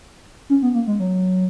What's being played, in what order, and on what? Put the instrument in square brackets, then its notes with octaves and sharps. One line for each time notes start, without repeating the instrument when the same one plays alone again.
[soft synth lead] C#4
B3
A#3
G#3
F#3